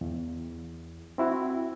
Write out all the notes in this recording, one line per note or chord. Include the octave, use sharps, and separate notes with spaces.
E2
C4 E4 F#4